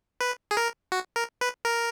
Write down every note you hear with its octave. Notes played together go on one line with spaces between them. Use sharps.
B4
G#4
A#4
F#4
A#4
B4
A#4